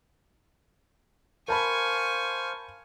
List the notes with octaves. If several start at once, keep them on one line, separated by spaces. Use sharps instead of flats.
A#4 C5 F5 G#5 A5 B5 C#6